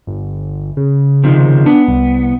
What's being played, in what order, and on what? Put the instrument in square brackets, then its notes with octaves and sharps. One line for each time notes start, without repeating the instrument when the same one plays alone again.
[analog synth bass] G1
C#3
[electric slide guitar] C3 D#3 F3
[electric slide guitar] B3 [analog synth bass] D4
[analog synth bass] C2